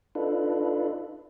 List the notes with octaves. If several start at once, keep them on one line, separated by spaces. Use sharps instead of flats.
D4 D#4 F4 A4 B4